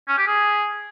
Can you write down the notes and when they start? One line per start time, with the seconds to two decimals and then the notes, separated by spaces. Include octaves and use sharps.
0.08 C#4
0.18 G4
0.27 G#4